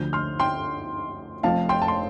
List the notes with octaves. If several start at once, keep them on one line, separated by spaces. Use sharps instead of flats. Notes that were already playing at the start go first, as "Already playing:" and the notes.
Already playing: D2 D3 F3 G6
C6 F6
G5 C6
F1 F2 F3 F5 A5
G5 C6
A5
C6